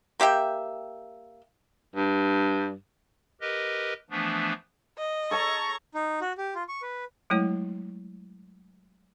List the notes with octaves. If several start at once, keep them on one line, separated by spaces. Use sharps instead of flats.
A#3 G4 E5 G5
G2
G4 A#4 B4 D#5
E3 F3 A3 B3 D4
D#5
A4 C#5 A5 A#5 C#6
D#4
F#4
G4
F4
C#6
B4
F#3 G#3 A3 E4 C#5